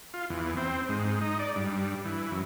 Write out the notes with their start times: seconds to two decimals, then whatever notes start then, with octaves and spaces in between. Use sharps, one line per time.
0.14 F4
0.30 E2
0.57 C4
0.89 G#2
1.21 D#4
1.39 D5
1.56 G2
2.05 E3
2.32 F#2